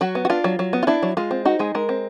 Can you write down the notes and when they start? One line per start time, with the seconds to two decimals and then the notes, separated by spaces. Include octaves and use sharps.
0.01 F#3 F#4
0.15 B3
0.25 F#4
0.30 D4 F4
0.44 F#3
0.59 F#3
0.73 B3
0.83 F4
0.87 D4 E4
1.03 F#3
1.17 G#3 F4
1.31 C4
1.45 D#4 F#4
1.59 G#3 G#4
1.75 G#3 A#4
1.89 C4